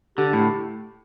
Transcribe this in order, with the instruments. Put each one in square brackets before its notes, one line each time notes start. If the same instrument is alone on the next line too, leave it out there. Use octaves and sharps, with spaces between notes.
[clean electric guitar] D3 [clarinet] G4
[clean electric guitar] A2